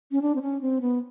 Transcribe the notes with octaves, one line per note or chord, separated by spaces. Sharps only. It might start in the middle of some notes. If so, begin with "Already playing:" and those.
C#4
D4
C4
C#4
C4
B3